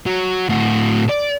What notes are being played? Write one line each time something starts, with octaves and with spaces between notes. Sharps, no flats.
F#3
A2 F#4
D5